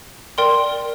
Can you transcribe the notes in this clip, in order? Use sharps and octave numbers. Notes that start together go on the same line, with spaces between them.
A#4 D5 G5 C6